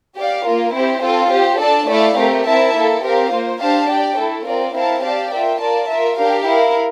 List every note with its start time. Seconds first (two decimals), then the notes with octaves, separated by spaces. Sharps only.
0.17 G4 D5 F5
0.46 A#3 F4 A#4
0.74 C4 E4 G4 C5
1.03 C4 F4 A4
1.31 C4 G4 C5
1.60 D4 A4 D5 A5
1.89 A3 E4 A4 D5 F5
2.17 A3 C4 G4 A#4
2.46 C4 E4 A#4 E5 A5
2.75 A#3 E4 A4
3.03 C4 G4 A#4 F5
3.32 A#3 F4 C5
3.60 D4 G4 C5 F5 A5
3.89 G4 D5 G5
4.17 A3 E4 A4
4.46 C4 F4 A#4 D5
4.75 C4 E4 A#4 F5 A5
5.03 G4 D5 F5 A5
5.32 F4 A#4 E5 G5
5.61 F4 A#4 D5 A5
5.90 F4 A#4 E5
6.18 D4 G4 A#4 F5
6.46 E4 A#4 F5